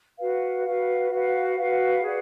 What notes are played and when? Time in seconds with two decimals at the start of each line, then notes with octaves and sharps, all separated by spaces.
0.19 F#4 B4 F5
0.64 F#4 B4 F5
1.11 F#4 B4 F5
1.56 F#4 B4 F5
2.02 G#4 D5 F#5